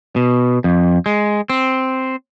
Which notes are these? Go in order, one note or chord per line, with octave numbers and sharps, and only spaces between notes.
B2
F2
G#3
C4